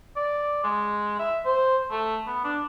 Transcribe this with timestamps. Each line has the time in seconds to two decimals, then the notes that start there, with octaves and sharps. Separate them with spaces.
0.16 D5
0.63 G#3
1.19 E5
1.45 C5
1.91 A3
2.26 B3
2.44 D4